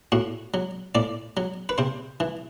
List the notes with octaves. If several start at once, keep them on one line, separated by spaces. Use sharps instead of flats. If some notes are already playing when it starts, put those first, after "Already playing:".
A2 F#4
F#3
A2 D5
F#3
B4
C3 C5
E3